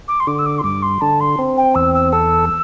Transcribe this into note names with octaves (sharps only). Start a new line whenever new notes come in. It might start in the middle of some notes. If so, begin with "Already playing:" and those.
D6
C6
D3 D6
E6
D6
C6
G2 D6
C6
D3 A5
C6
C4
G5
E2 E6
E6
A4 E6